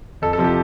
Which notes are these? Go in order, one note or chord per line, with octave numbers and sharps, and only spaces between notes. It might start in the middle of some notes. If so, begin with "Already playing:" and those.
F2 A4
A4
C3 F3
G4